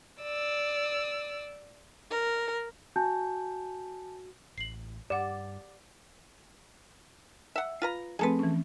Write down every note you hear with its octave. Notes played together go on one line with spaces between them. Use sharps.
D5 E6
A#4
F#4 G#5 A5 G6
A1 C7 F#7
G2 G4 D5 F#5
E5 F#5
F4 B4 A#5
F3 A3 C4 G#4 A4 B4
E3 C#4